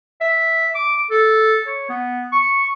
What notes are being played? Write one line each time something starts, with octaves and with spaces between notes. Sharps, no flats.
E5
D6
A4
C#5
B3
C#6